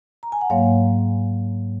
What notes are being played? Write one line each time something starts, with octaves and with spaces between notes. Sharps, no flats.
A#5
G#5
F#5
G#2 F#3 A#3 C#5 F5